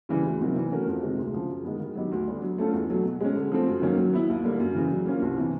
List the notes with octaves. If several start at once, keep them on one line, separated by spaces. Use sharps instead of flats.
C#3 E3 G3
D2
C3 D#3 F#3
E3
A3 C#4 F#4 A#4
F2
C3 D#3 G#3
D2
C#3 F3
F#2
D#3 G#3 B3
D#3
F#3 B3 D#4 G4
D2
D3 G3 B3 D4
F#3
A3 C#4 F4 A4
E2
B2 F#3 A3
B2
G#3 C#4
D3
F3 A3 C4
F#2
D#3 F#3 A#3 C#4
F#3
B3 E4
D#2
D3 G3 A#3
F#2
C#3 E3
F#3
A#3 C#4 F4
C2
C3 E3